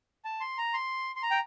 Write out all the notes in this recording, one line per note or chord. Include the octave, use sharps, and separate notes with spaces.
A5
C6
A#5
C6
C6
A#5
G5